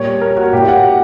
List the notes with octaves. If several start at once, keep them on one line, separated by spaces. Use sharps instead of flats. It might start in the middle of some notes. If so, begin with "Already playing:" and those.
Already playing: A#2 G3 A#3 C#5
A#4
F#4
A#2 A#3 E4 G4
F#5